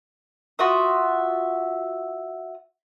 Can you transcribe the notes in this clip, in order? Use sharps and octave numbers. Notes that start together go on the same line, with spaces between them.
F4 F#4 E5 D#6